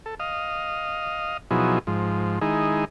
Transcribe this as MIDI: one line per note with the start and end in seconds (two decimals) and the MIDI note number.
0.06 0.15 69
0.20 1.37 75
0.20 1.37 77
1.51 1.79 47
1.51 1.79 53
1.51 1.79 54
1.51 1.79 63
1.51 1.79 64
1.51 1.79 68
1.87 2.39 44
1.87 2.39 53
2.41 2.85 51
2.41 2.85 56
2.41 2.85 63
2.41 2.85 64
2.41 2.85 68